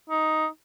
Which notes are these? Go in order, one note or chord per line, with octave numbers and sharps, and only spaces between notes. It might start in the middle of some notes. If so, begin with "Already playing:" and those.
D#4